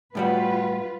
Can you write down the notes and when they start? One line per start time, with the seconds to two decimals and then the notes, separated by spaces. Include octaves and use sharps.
0.15 A2 G3 F4 F#4 B4